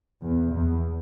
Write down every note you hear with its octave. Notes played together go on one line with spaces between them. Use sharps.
E2
E2